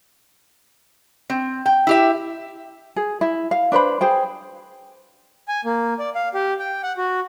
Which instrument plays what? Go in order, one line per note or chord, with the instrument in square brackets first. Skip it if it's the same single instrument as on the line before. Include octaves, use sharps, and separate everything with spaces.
[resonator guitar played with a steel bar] C4
G5
E4 G4 E5
[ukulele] G#4
E4
F5
D4 B4 C5 B5
G#4 C5 G5
[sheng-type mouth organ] G#5
A#3
D5
F5
G4
G5
F#5
F#4